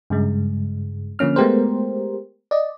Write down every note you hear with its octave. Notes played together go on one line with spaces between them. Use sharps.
G2 C#3 G#3
D3 F3 A#3 C#4 F6
G#3 A3 B3 G4 A#4 C5
D5 D#5